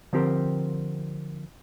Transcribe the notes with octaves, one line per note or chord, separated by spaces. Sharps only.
D3 F3 C4 G4 A#4 C5